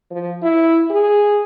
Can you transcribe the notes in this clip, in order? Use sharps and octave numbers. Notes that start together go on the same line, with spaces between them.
F3
E4
G#4